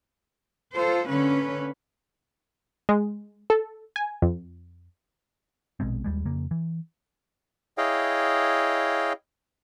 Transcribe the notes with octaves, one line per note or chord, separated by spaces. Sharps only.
F4 A4 C5
D3 A#3 C#4 B4
G#3
A4
G#5
F2
A#1 B2 G#3 C4
D#2 G3 G#3
F2 C#3 A#3
E3
E4 G#4 C#5 D#5 F5 G5